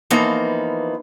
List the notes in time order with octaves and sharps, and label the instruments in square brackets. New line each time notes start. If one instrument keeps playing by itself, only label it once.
[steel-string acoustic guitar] E3 F3 A#3 B3 D#4